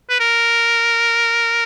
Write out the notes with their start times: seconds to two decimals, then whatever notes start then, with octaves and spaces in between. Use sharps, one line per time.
0.10 B4
0.20 A#4